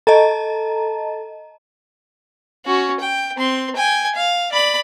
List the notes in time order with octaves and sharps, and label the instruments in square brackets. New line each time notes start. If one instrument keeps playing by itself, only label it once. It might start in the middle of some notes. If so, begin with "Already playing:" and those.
[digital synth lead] A4 [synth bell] D#5 A5 A#5
[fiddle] C#4 F#4
G5
C4 C6
G5 G#5
F5
D5 B5